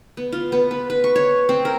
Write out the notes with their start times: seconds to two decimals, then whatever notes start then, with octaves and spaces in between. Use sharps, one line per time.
0.17 B3
0.32 F4
0.52 B3
0.71 B4
0.90 B4
1.04 C#6
1.16 C#5
1.49 C4
1.65 A#4